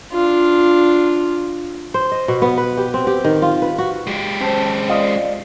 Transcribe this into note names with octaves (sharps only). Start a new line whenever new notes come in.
D4 F4
C5
D#5
B2
B3
B4
G4
C4
G4
D#3
F4
B4
F#4
G#3 G4
C#4 C5 A5
F4 D5 D#5 F5